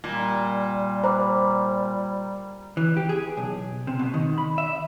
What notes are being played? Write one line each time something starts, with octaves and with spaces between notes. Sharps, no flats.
A#2 G3
C5 A#5 B5 D6
E3
G4
G#4
B1
C3
B2
D#3
B5
E5